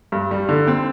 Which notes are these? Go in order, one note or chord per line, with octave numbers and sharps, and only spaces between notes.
G2
G3
D3
C4